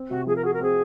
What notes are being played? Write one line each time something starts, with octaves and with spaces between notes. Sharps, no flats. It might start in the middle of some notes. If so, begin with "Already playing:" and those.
Already playing: C4
C3 F#4
F3 G#4
A#4
F#4 G#4
A#4
C4 G#4